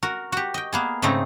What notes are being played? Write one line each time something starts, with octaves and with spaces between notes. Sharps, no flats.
F#4 A#4
F#4 G4
D#5 G5
A#3 B3 G#4
G#2 C#3 A3 C4 D#4 A#5